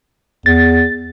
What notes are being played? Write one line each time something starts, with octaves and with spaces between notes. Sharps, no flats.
E2 A6